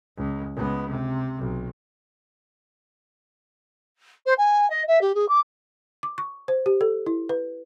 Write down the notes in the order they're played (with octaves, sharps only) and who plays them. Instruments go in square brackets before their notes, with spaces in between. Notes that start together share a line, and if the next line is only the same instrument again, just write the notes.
[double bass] C#2
C#2 B3
C3
B1
[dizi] C5
G#5
D#5
E5
G4
G#4
D6
[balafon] D6
C#6
C5
G4
A4
E4
B4